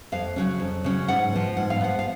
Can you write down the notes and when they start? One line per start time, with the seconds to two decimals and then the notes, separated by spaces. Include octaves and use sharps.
0.12 F2 F5
0.36 C#3 F#3 C#4
0.60 F2
0.84 C#3 F#3 C#4
1.08 G#2 F#5
1.33 F3 B3
1.57 G#2 F#5
1.70 F5
1.81 F3 B3 F#5
1.99 F5